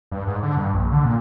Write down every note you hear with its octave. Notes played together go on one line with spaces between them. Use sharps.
G2
G#2
D3
G2
A#1
D3
A#2